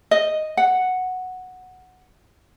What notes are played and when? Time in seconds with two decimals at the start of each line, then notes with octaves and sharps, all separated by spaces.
0.11 D#5
0.57 F#5